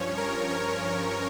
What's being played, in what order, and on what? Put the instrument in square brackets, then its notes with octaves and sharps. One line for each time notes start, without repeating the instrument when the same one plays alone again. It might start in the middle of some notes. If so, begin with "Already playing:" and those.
Already playing: [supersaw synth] G2 F3 C#4 C#5
A#4
C#5